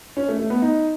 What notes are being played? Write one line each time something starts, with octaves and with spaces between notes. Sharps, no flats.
C#4
A3
A3
B3
D#4